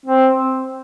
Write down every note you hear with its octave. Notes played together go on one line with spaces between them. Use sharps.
C4